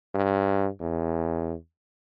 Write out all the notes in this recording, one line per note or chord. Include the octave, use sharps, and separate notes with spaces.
G2
E2